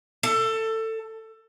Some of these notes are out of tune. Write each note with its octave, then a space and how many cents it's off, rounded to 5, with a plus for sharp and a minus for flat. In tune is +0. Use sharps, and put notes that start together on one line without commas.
A4 +20